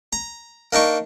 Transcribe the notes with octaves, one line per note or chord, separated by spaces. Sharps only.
A#5
A#3 D4 D#4 C#6